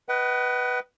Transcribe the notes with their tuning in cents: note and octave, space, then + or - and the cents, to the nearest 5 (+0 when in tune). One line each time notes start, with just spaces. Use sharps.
B4 +0 D#5 +0 F#5 +40